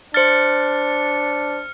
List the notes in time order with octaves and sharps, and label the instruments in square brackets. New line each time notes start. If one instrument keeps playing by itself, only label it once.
[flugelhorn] D4 [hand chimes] C5 A6 [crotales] F6 C#7